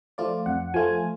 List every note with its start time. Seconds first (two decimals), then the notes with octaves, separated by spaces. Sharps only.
0.18 F3 A3 F4 D5
0.46 F2 F#5
0.74 F3 A3 F4 G#5